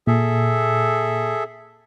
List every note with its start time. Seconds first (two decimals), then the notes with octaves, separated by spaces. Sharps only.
0.07 A#2 G#4 A4 E5